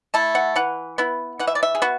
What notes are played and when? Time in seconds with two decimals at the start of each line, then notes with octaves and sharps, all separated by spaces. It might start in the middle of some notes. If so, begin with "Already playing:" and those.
0.14 A3 E4 A5
0.35 F#5
0.56 E3 F#5
0.98 B3 E4
1.39 E3 F#5
1.47 E5
1.55 D5
1.63 E5
1.75 G#4
1.82 B3 F#4